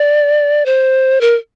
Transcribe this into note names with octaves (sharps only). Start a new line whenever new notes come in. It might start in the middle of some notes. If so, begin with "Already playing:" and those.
Already playing: D5
C5
A#4